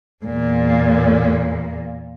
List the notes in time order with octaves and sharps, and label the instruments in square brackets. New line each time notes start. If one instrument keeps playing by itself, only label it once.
[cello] E2 A#2